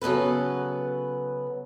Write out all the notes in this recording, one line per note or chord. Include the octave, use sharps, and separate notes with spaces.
C#3 F#3 B3 A4 B4